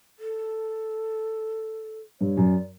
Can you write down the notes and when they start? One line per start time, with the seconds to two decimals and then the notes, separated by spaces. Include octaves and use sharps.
0.19 A4
2.20 G2 C#5
2.37 F#2
2.43 D5